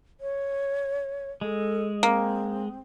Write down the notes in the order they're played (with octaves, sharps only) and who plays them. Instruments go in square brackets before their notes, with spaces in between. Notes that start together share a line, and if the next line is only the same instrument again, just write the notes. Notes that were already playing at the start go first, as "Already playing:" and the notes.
[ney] C#5
[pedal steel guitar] G#3 [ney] A4
[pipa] A#3 [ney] C4